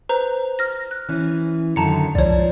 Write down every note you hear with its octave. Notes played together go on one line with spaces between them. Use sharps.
B4 C5 A#5
F6 A#6
F#6
E3 C#4
F#2 D3 D#3 A5 A#5 C#7
C2 G#2 F3 C#5 D5